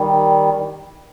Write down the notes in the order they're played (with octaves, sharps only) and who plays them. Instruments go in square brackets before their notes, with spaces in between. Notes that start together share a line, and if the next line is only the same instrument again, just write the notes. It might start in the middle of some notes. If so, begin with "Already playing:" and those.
Already playing: [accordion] D#3 G3